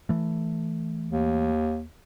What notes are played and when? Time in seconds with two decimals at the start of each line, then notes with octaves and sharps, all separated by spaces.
0.09 E3 A3
1.12 D#2